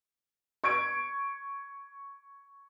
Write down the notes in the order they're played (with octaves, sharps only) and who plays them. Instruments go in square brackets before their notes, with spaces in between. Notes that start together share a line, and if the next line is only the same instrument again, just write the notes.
[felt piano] C#6 G#6 D7